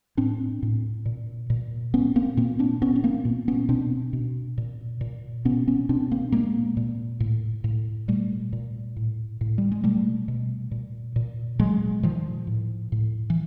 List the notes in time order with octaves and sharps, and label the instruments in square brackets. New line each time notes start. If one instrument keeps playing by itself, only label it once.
[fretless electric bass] A2 C4 D4
A2
A#2
A#2
A#2 B3 C#4
A#3 C4
A#2 A#3 C4
C4 D4
A#2 B3 C#4
C#4
A#3 C4
A#2
B3 C#4
B2 C4 D4
B2
A#2
A#2
B2 B3 C#4
B3 C#4
B2 C4 D4
A#3 C4
A#2 G#3 A#3
A#2
A2
A2
A#2 G3 A3
A#2
A2
A2
G3
G#3
B2 G3 A3
B2
A#2
A#2
A#2 F#3 G#3
A#2 D#3 F3
A2
A2
E3